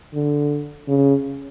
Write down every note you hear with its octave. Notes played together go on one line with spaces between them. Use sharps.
D3
C#3